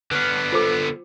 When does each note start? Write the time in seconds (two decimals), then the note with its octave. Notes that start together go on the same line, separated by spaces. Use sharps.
0.11 D3 B3 B4 C#5 F6
0.52 F4 A4 C5 D6